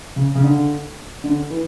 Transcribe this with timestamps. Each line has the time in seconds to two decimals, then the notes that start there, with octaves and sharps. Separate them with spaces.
0.16 C#3
0.35 C#3
0.43 D3
1.24 D3
1.50 E3